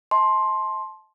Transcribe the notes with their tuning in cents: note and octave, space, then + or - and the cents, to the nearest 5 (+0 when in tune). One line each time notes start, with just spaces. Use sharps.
E5 -45 A5 -20 C6 +10